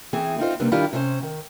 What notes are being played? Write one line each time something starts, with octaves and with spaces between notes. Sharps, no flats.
E3 C4 G#4
C4 D#4 F4 C5
C3 G3 A#3 C4 D4 B4
D#3 G3 D4 E4 F4 G4
C3 C#4 C5
D#3